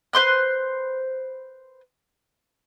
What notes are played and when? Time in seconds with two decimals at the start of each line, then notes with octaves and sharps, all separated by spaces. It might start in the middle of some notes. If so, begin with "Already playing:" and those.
0.13 B4 C5 C6 F#6